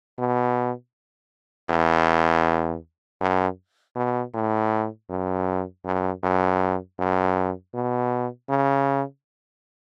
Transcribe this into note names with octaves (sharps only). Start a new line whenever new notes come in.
B2
E2
F#2
B2
A2
F#2
F#2
F#2
F#2
B2
C#3